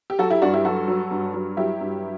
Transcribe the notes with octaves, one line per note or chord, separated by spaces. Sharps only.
G4
F#3 F#4 A4
E4 G4
G2 D4 F#4
E4 G4
F#3 F#4 A4
F#3
G2
F#3
F#3 E4 G4
G2